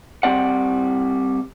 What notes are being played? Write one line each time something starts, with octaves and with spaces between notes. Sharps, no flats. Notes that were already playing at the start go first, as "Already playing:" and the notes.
G3 C4 D5 F#5